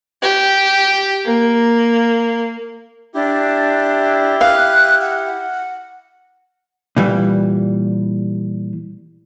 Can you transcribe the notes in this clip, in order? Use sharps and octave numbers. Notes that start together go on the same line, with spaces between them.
G4
A#3
D4 E4 G4
F5 F#6
F#5
A#2 E3 G3